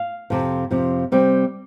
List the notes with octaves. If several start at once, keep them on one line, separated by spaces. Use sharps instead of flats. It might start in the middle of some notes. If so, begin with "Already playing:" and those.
Already playing: F5
F2 C3 F3
F2 C3 F3
C3 G3 C4